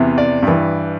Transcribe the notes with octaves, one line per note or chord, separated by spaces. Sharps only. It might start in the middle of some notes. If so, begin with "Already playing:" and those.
Already playing: E2 C3 E3
D5
G2 E3